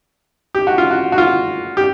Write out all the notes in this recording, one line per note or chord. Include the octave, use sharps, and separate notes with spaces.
G4
F#4
F4
F#4
F#4
F4
G4